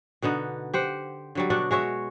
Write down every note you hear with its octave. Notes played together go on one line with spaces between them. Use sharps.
B2 D3 B3 D#4
G4 C5 F#5
D3 F#3 G3
B2 D4 F#4 A4
G#3 F#4 C#5 E5